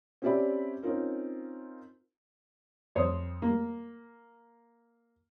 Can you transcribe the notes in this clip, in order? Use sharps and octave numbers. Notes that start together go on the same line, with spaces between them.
C4 C#4 G4 D5 E5 B5
C4 C#4 D#4 F4 A#4
F2 C5 C#5 C6 D#6
A#3